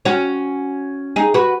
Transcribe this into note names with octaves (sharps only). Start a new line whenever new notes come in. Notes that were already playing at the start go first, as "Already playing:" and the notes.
C#4 F#4
D#4 G#4
F#4 B4